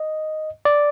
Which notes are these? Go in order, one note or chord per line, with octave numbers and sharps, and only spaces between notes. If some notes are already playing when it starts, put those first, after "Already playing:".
Already playing: D#5
D5